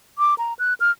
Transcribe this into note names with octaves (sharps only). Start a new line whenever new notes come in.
D6
A#5
F#6
F6